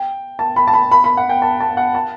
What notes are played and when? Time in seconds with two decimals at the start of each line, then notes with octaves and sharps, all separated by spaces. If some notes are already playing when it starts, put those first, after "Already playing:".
Already playing: G5
0.39 A5
0.56 B5
0.68 A5
0.73 B5
0.92 B5
1.04 B5
1.17 F#5
1.29 G5
1.42 A5
1.60 A5
1.77 F#5
1.95 A5